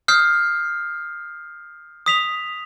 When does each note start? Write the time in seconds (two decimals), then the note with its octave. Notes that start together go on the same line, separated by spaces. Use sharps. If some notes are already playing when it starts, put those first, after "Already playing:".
0.08 D#6 F6 G6 C7
2.06 D#6 B6 F7